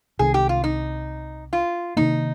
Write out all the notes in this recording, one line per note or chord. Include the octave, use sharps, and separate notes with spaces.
C2 C3 D#3 G#3 G#4
G4
F4
D#4
F4
C3 D#3 A#3 D#4